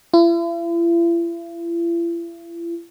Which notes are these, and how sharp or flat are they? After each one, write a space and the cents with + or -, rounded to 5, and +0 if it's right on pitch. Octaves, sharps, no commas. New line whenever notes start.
E4 +45